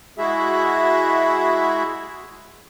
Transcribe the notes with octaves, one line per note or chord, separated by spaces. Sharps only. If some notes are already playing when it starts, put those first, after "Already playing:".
G#3 E4 F#4 G#4 E5